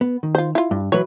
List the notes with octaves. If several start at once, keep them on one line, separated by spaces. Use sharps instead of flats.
B3
D#3
F4 C5
E4 F4
G2
E3 F#3 B4 C#5